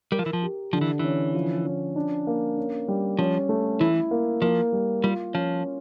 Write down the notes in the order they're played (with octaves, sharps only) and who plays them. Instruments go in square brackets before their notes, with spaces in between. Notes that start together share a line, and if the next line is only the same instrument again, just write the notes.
[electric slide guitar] G3 [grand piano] A#4
[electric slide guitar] F3
E3
F3
[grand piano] G4
[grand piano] D3 [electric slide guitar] F3
[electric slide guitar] E3
[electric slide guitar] E3 [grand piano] C#4
[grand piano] F3
C#4
D4
A#3
C#4
G3
[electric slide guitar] F3 [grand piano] C#4
[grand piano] A3
[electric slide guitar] E3 [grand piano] E4
[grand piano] A#3
[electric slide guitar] F3 [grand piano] A#3
[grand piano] G3
[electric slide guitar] G3 [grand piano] F4
[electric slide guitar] F3 [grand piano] C#4